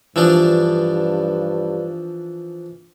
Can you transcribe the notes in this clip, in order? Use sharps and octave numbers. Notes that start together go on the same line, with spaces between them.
G2 E3 F3 D4